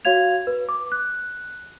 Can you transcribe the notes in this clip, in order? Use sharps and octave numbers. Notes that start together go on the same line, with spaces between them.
F#4 C#5 F5 G#6 F7
B4
D6
F#6